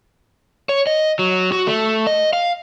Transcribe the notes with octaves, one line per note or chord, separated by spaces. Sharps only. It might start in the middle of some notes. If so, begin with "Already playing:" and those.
C#5
D#5
F#3
F#4
A3
D#5
F5